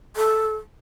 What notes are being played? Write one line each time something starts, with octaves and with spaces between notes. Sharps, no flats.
A4